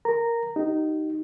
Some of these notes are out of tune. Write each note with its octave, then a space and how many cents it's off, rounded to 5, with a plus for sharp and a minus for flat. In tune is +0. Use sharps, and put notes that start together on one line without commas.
A#4 +0 A#5 -10
D#4 +0 G4 -35